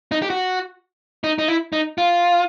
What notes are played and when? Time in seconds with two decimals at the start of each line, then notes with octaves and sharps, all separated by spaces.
0.12 D#4
0.22 G4
0.30 F#4
1.24 D#4
1.38 D#4
1.48 E4
1.73 D#4
1.98 F4